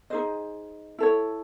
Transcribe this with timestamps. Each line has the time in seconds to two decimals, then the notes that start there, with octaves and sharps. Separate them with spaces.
0.10 D#4 G#4 C5 D#5
0.99 E4 A4 C#5